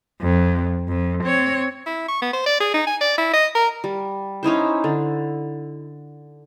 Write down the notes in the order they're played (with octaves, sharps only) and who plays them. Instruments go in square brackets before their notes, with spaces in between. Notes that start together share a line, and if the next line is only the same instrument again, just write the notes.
[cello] F2
F2
C4 C#5
[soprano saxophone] E4
C#6
B3
C5
D5
G#4
D#4
G#5
D5
E4
D#5
A#4
[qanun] G3
C#4 D#4 E4 C5
D3